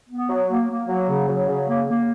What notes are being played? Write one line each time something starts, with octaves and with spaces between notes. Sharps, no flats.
B3
F#3
A#3
A#3
F#3
C#3
F#3
C#3
A#3
A#3